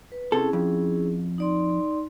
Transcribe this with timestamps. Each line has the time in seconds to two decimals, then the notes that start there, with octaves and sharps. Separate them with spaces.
0.12 B4
0.32 C3 C#4 E4 G#4 A4
0.53 F2
1.38 D#4 D5 C6